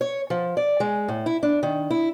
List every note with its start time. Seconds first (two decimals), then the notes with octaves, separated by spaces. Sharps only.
0.01 C#5
0.30 F3
0.57 D5
0.80 G#3
1.08 A2
1.26 E4
1.43 D4
1.63 D#3
1.91 E4